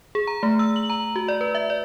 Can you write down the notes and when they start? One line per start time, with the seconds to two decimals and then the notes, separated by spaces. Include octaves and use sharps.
0.15 G#4
0.27 A#5
0.43 A3
0.59 E6
0.76 F#7
0.90 A#5
1.16 F#4
1.28 D5
1.41 B4
1.55 E5
1.70 D5